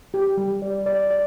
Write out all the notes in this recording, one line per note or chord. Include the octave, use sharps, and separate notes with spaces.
G4
G3
D5
D5
D5